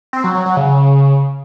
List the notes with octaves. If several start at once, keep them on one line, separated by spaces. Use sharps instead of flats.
C4
F#3
F#3
F#3
C#3